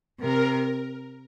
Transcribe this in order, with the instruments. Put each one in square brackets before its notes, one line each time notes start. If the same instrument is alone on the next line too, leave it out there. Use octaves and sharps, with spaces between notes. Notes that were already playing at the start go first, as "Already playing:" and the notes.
[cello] C3 [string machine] A#4